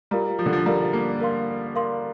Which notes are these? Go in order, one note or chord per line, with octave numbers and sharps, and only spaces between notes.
G3 F4 A#4 F5 A#5
F3
D3
F3
G3 F4 A#4 F5 A#5
A#3
A#4 F5 C6
A#4 F5 C6